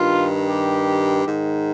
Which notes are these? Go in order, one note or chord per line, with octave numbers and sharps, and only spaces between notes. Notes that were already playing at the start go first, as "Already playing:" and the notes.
Already playing: G2 D#3 F4
G4
G#2 D#3